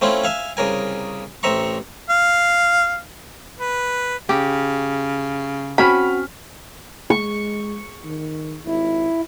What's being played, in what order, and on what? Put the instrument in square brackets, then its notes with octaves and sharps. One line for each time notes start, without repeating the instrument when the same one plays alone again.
[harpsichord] A3 C4 C#4 E4 F4
E5 F5 G#5
C2 C#3 A#4 G#5
A1 C4 E5 A#5 C#6
[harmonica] F5
B4
[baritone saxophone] C#3 [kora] G4
[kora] C4 C#4 [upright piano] F#4 F6 B6 [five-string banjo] B5
[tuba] G#3 [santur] C#6
[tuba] D#3
[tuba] G#1 [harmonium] E4